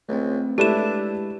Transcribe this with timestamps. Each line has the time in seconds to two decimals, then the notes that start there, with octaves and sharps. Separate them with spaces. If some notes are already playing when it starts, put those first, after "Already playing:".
0.09 C#2 A3 C4
0.58 G#3 A3 D4 E4 G4 B4 E7